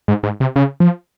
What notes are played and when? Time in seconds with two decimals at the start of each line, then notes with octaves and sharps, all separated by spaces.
0.08 G#2
0.23 G#2
0.40 C3
0.56 C#3
0.80 F3